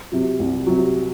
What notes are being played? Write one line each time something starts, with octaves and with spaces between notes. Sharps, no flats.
C3 F#3
C2
C3 F#3